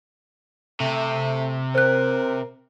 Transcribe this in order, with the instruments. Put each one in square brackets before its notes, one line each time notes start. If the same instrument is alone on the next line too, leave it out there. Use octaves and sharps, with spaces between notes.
[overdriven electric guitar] C3 [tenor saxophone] A3
[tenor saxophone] A#4 [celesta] C5 F#6